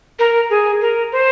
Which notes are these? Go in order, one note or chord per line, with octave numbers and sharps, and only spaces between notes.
A#4
G#4
A#4
C5